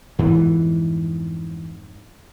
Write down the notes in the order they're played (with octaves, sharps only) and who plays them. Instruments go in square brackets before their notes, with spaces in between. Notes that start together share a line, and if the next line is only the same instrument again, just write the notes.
[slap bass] F2 G#2 B3 [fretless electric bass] E3